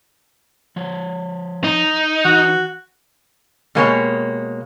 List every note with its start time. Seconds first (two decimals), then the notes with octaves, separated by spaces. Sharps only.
0.76 F3 C#5
1.64 D#4
2.25 E3 F#4
3.75 B2 G#3 A#3 G4 C#5